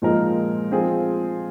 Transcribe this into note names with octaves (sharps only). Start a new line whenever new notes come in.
A#2 F3 G#3 D#4 A#4
F3 C4 F4 G#4